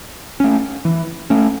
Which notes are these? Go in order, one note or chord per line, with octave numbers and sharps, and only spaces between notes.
A3 C#4
E3
A3 C#4